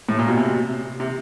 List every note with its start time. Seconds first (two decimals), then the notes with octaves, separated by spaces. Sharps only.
0.09 A2
0.19 A#2
0.28 B2
0.37 C3
1.00 C3